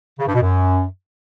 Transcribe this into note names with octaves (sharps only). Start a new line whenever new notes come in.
C#3
G2
B2
F#2